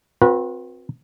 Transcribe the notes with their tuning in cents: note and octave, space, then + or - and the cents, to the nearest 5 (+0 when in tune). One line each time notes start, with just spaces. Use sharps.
C4 +0 F#4 -40 B4 -35